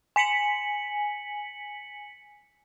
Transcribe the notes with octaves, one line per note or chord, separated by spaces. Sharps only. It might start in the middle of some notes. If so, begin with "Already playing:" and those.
G#5 B6 C#7 F#7